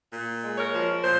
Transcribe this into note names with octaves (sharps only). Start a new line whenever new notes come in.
A#2
G#3
A#4 C#5
F3
A#2 C5